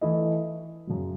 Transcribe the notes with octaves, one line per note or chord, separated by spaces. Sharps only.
E3 A3 E4 A4 D#5
F#2 C#3 F#3